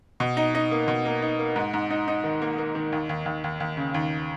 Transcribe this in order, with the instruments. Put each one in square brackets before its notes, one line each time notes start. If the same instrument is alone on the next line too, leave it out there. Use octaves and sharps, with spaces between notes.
[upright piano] B2
D#4
D#4
A#3
B2
A#3
D#4
A#3
G#2
G#2
D#4
D#4
D#3
A#3
A#3
D#3
D#2
D#2
D#2
D#2
D#2
C#3
D#2